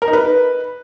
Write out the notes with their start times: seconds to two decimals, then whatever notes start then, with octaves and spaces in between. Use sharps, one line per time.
0.02 A#4
0.08 D#4
0.13 B4